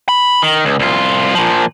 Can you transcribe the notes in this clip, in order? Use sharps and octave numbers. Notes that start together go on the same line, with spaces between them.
B5
D#3
C#2
C2 F4
A#2 F3